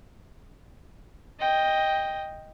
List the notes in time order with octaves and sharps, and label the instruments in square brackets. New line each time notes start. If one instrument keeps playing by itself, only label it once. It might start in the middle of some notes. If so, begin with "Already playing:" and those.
[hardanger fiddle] D#5 G5